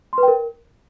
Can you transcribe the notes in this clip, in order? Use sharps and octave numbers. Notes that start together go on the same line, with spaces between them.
C6
B4
G5
A#4